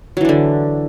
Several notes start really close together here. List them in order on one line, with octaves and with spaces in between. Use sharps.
F#3 E3 D4 D3